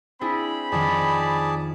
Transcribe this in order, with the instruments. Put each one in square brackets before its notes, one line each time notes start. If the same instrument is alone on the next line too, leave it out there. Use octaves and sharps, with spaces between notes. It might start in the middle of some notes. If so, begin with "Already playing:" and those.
[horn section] C4 B5 [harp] D4 E4 G#4
[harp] F2 D#3 [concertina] G#4 D5 A5